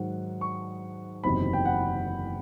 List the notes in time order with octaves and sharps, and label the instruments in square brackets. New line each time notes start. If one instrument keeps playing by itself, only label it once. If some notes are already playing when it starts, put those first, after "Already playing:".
Already playing: [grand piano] G#2 D#3 F#3 F#5
C#6
F#1 E2 C3 D#3 F#3 B5
G5
F#5